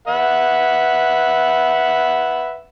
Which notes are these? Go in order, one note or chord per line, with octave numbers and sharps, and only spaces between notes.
B4 E5 F#5